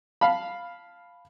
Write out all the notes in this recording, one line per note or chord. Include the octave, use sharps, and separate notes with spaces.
F5 A5 B5